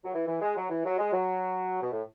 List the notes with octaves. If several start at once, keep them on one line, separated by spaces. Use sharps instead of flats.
F#3
E3
E3
G#3
F#3
E3
F#3
G#3
F#3
B2
A2